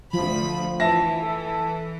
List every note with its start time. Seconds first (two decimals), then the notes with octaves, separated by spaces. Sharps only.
0.13 D2 F3 B5
0.80 E3 E5 A5 A#6
1.22 A4